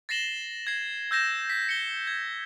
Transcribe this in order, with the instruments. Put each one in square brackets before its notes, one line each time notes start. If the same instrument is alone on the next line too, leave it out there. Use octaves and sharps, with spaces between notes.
[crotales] A6 A#6 C7 E7 F#7 G7
G#6 C7
E6 G6 A#6 E7
B6
C#7 G7
G#6